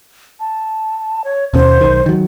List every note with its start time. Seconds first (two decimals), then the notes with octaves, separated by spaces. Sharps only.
0.40 A5
1.24 C#5
1.54 D#2 B2 C#4 C5
1.81 B1 D#3
2.06 D#3 F#3